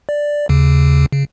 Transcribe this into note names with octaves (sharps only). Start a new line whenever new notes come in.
D5
D#2 C#3
C#3